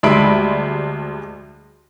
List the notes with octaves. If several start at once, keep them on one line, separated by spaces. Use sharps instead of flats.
D2 G3 G#3 E5 B5 D7